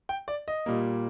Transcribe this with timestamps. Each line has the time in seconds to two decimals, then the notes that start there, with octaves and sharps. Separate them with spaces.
0.09 G5
0.28 D5
0.48 D#5
0.66 A#2 G3 A#3